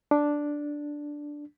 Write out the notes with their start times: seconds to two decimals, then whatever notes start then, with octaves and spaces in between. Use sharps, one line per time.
0.11 D4